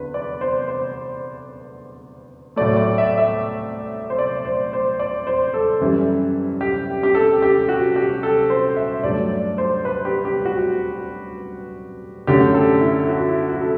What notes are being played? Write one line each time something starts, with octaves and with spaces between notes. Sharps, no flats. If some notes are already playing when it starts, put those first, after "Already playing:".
Already playing: E2 D3 B4
D5
C5
C5
A2 F#3 A3 D5
D5
E5
E5
C5
D5
C5
C5
D5
C5
A4
F#2 E3 G3
G4
G4
A4
G4
F#4
G4
A4
C5
E5
G2 F#3 A3 D5
C5
B4
G4
G4
F#4
F#2 D3 F#3 A3 G4
A4
E4
F#4
E4
F#4
A4